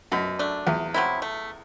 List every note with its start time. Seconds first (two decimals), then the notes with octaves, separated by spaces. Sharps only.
0.12 F#2 B2
0.39 A3 D4
0.67 E2 C3
0.94 F#3 C4 E4
1.22 A3